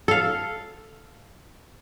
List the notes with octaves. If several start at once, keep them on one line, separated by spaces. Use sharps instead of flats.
A4 F5